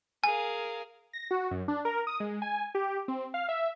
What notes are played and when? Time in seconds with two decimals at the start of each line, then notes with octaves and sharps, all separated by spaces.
0.24 G#4 A#4 F5 G#5
1.13 A#6
1.31 F#4
1.51 F#2
1.68 D4
1.85 A#4
2.07 D#6
2.20 G#3
2.42 G#5
2.75 G4
3.08 C4
3.34 F5
3.49 E5